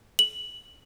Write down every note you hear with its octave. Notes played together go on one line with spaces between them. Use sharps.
F#7